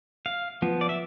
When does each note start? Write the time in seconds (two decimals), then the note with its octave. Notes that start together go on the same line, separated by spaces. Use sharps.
0.26 F5
0.62 F3 B3
0.81 D5
0.89 E5